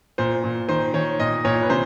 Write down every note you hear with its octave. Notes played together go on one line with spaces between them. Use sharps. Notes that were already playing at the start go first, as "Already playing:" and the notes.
A#2 C5
A#2
D#3 C5
D#3 C#5
A#2 D#5
A#2 C#5
B4
C3 C5